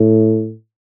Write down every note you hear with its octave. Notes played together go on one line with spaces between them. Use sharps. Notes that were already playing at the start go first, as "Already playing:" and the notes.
Already playing: A2